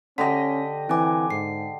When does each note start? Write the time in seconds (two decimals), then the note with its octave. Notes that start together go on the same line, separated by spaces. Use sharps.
0.18 D3 C#4 G4 D#5 B6
0.89 E3 C4 G#5 D6
1.30 G#2 C7